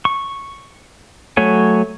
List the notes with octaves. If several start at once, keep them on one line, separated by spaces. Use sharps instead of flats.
C#6
F#3 A3 C#5 G#5